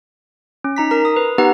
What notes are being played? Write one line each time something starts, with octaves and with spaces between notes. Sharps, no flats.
C#4
D#4 A#5 B6
A#4 A#5
D#6
B4
B3 D#4 G4 B4 F#5 A#5